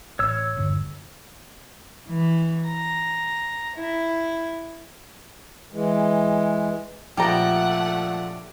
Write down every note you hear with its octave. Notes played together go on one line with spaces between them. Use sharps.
A1 C#5 E6
D#1 G2 D3
E3
A#5
E4
E3 G#3
A#1 F3 A3 G4 A4 F#5 A#5 D7